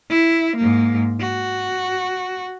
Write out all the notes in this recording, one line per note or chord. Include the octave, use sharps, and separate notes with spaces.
E4
G#2 A#3
F#4